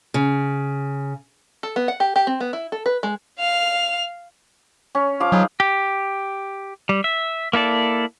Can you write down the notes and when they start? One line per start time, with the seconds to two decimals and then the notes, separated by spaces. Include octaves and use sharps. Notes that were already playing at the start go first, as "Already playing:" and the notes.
0.14 C#3
1.63 A4
1.76 B3
1.88 F#5
2.00 G4
2.16 G4
2.27 C4
2.40 B3
2.53 E4
2.72 A4
2.86 B4
3.03 G#3
3.39 F5 F7
4.95 C#4
5.20 F3 F5 D6
5.32 F#3 D#4 G#4 B4
5.60 G4
6.89 G3
7.04 E5
7.53 A#3 E4 A4 D5